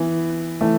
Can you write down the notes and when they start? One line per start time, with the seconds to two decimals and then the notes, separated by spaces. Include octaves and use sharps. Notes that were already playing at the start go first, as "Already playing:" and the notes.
Already playing: E3 B3
0.61 E3 A3